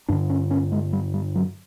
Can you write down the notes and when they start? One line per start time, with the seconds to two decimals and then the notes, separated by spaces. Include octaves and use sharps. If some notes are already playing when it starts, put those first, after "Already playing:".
0.08 G2 D3 D4
0.30 C#4
0.51 C#4
0.72 G#3
0.93 G3
1.14 G3
1.35 F#3